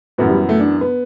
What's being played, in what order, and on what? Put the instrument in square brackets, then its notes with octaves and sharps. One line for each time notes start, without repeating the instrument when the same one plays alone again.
[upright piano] F#2 E3 B3 F#4 [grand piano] A2
[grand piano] G3
A3
D4
B3